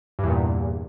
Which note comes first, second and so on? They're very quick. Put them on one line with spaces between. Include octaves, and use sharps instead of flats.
G2 E2 A#2